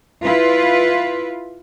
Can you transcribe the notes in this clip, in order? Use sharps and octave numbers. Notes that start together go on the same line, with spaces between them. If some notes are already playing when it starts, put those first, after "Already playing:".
E4 F4 B4